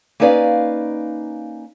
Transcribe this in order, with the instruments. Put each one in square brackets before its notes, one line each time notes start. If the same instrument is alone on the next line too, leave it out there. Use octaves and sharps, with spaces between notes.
[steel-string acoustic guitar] A#3 C#4 D#4 B4 D5 F5